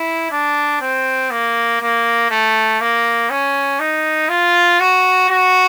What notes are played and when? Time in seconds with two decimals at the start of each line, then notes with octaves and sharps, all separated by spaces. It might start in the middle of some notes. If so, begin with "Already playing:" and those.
Already playing: E4
0.31 D4
0.81 C4
1.31 A#3
1.81 A#3
2.30 A3
2.80 A#3
3.30 C#4
3.80 D#4
4.29 F4
4.80 F#4
5.29 F#4